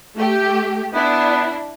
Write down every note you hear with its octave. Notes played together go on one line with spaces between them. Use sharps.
A3 G4
B3 D4 E4